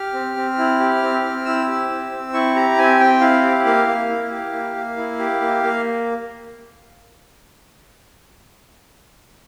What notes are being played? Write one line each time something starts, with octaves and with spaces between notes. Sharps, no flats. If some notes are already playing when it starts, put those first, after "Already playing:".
Already playing: G4 F6
C4
C4
E4
G4
C4
C4
E4 E6
G4
C4
C4
E4 C#6
G4 A#5
C4 G#5
C4 G5
E4 F5
G4
A#3 F5
A#3
E4
G4
A#3
A#3
E4
G4
A#3
A#3